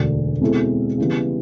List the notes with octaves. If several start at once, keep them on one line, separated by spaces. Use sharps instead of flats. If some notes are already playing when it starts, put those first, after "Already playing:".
Already playing: E1 D2 D3
B2 G#3 C4 E4 A4
C#3 E3 G3 B3